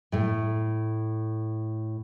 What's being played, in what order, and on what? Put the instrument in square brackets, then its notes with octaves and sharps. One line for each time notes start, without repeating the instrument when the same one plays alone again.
[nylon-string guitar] A2 A3